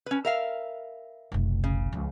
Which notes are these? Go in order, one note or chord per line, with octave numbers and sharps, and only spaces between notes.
C#4 B4
A#4 E5 F5
F1 B1
C#3
C#2 F3